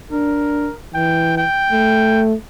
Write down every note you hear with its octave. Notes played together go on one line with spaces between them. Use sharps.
D4 A#4
E3 G5
G5
A3